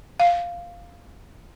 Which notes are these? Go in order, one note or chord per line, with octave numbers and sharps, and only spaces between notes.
F5